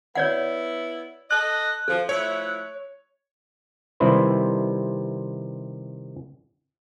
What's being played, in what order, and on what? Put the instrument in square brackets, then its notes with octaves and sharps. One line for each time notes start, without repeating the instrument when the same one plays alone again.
[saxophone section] B3 E4 [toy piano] C#5 D5 F#5
[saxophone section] A4 D#5 [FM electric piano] F#6
[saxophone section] F3 [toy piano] A4
[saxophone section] F3 A3 E4 [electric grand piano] C#5
[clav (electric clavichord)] C3 D#3 G3 E4 B4 C5